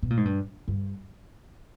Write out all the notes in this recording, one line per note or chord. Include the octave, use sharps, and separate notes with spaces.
B2
A#2
G#2
G2
G2